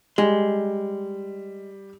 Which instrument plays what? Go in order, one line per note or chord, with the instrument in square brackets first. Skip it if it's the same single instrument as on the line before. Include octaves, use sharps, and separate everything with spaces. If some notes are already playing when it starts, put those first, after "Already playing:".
[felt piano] G3 [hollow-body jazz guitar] G#3